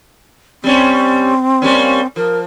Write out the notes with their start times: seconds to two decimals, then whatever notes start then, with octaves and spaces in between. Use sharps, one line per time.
0.64 G3 C4 C#4
1.62 G3 A#3 C#4
2.16 F3 A#4